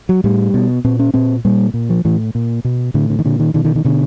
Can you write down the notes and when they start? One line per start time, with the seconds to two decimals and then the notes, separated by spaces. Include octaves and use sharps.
0.09 F#3
0.24 A2 G3
0.54 B2
0.84 A#2 C4
0.99 C#4
1.14 A#2 C4
1.45 A#2 G3
1.74 A#2
1.90 F3
2.05 A2 E3
2.35 A#2
2.65 B2
2.94 A2 D3
3.10 D3
3.19 D#3
3.25 A#2 D3
3.40 D#3
3.54 B2 D#3
3.65 D#3
3.75 D#3
3.85 B2 D3